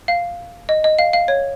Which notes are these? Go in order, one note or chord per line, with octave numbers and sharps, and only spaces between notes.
F5
D#5
D#5
F5
F5
C#5